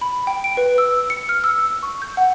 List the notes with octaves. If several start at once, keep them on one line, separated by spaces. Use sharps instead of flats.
B5
G5
D7
B4
E6
C#7
F6
E6
C#6
G6
F#5